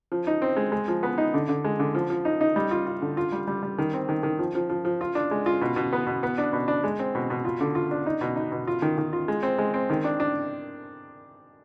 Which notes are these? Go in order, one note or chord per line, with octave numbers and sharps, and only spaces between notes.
F3
D#4
C4
G#3
G#3
F3
B3
D#4
D3
D3
G#3
D3
F3
F3
D#4
D#4
G3
F4
F4
D3
F4
G3
G3
G3
D#3
C4
D#3
D#3
F3
F3
F3
F3
F4
D4
G#3
F4
B2
B2
B3
B2
B3
D4
B2
D4
G#3
C4
B2
B2
F4
D3
F4
D4
D#4
B2
D#4
B2
F4
D#3
D#3
F4
G#3
C4
G#3
C4
D#3
D4
D4